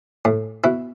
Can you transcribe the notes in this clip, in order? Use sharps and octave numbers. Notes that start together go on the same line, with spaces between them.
A2
B2 E4